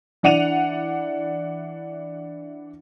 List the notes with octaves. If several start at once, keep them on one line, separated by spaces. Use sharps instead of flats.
E3 D4 F#5 D#7 F7